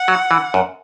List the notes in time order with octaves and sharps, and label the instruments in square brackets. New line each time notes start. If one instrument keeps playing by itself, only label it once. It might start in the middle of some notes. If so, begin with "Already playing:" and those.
Already playing: [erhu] F#5
[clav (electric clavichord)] F#3
E3
F#2